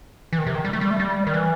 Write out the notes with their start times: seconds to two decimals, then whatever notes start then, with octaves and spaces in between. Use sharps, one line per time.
0.33 E3
0.38 D#3
0.46 C3
0.55 D#3
0.65 G3
0.73 A3
0.81 G3
0.90 A3
1.00 G3
1.27 D#3
1.34 E3